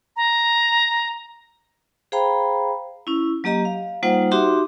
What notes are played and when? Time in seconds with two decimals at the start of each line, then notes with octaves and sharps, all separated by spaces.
0.17 A#5
2.12 G#4 C5 F5 G5 A#5 B5
3.07 C#4 E4
3.44 F#3 A#3 G4 D#5 A#5
3.65 F5
4.03 G3 A#3 D#4 F4 C5 F#5
4.31 D#4 F#4 G4 E5 C6 D6